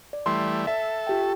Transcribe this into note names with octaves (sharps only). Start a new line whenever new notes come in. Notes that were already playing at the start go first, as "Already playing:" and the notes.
D5
E3 G3 A3 C6
A4 E5
F4 G4 G5